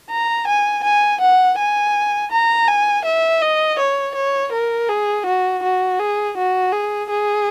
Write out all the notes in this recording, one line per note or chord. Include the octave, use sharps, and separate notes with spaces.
A#5
G#5
G#5
F#5
G#5
A#5
G#5
E5
D#5
C#5
C#5
A#4
G#4
F#4
F#4
G#4
F#4
G#4
G#4